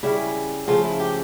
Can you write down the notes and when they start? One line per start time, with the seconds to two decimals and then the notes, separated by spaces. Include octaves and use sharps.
0.03 C#3 G3 C#4 E4
0.67 C#3 F3 A3 F4
0.84 E4
1.00 G4